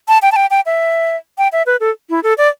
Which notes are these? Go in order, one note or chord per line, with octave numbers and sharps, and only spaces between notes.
A5
G5
A5
G5
G5
E5
G5
E5
B4
A4
E4
A4
D5